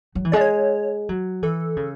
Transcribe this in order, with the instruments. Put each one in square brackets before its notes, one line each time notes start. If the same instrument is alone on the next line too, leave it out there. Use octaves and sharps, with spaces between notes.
[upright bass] F#3
E3
[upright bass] G#3 [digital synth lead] D5
[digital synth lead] C#5
[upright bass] F#3
[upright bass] E3 [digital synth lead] A4
[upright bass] C#3